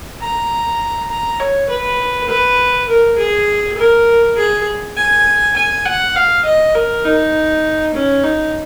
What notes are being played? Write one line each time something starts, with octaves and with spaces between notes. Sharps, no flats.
A#5
A#5
C#5
B4
B4
A#4
G#4
A#4
G#4
G#5
G#5
F#5
F5
D#5
A#4
D#4
C#4
D#4